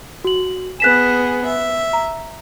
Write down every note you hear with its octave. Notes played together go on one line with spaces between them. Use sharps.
F#4 F#7
B3 G#4 F#6 B6 E7
E5
A#5